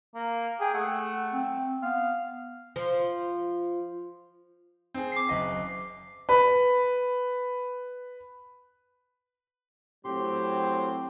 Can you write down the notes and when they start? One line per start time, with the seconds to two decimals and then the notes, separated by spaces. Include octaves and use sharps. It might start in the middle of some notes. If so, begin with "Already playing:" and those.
0.15 A#3
0.60 G#4 G5
0.74 A3 F#5
1.33 C4
1.83 B3 F5
2.76 F3
4.94 C4 G#4
5.12 D6 C7
5.27 F#1 D#5 B6
6.29 B4 B5
10.05 A2 F#3 C4 G4 C6